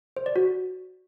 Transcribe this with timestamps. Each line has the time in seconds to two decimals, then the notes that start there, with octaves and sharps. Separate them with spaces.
0.17 C5
0.26 D5
0.36 F#4